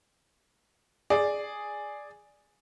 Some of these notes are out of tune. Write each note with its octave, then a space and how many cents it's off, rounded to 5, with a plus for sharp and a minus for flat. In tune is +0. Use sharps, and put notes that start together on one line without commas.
G#4 +0 D5 +0